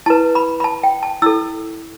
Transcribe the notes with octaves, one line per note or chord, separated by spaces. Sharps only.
E4 B4 A5
B5
B5
A5
G5
A5
E4 A4 E6